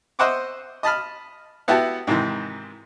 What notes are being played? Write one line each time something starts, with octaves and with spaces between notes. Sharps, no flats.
C5 D#5 E5 F#5 C#6 D6
D#5 A5 B5 F6
B3 E4 F#4 G4 E5 A5
G#2 C3 D#3 E3